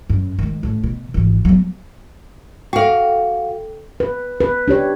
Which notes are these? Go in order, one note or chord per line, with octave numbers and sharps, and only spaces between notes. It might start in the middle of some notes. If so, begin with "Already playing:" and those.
F#2
D#3 G#3
A1 A2
B2
G#1 E3
F#3 B3
F#4 A4 F5 G5
B4
B4
D4 G4 C#5